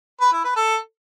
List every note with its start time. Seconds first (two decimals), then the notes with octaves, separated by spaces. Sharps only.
0.21 B4
0.33 E4
0.44 B4
0.56 A4